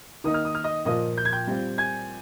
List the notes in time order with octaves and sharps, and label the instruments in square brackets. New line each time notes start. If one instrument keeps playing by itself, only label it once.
[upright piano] D#3 A#3 D#4 [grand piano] D#6
[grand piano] F6
D#6
F6
D#5 D#6
[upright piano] A#2 F3 A#3 F4 [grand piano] D#5 D#6
[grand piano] G6
G#6
G5 G6
[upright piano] G3 C4 F4
[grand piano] G#5 G#6